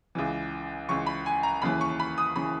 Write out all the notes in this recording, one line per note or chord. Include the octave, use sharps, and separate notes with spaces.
C#2 C#3 E3
C#2 C#3 E3 C#6
B5
G#5
A#5
D#2 C#3 E3 B5
C#6
B5
D#6
C#3 E3 B5